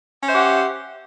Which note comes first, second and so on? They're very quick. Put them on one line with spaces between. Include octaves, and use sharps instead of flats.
C#4 C5 E5 G4 F#5